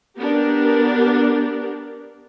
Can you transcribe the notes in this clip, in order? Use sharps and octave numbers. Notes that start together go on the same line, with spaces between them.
B3 D4 G4 A#4